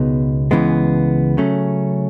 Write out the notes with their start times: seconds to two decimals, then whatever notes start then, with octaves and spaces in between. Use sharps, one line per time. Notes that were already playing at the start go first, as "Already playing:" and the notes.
Already playing: C#2 B2 G#3 B3 D#4
0.51 C#2 C#3 E3 G#3 B3
1.37 C#3 F#3 A3 C#4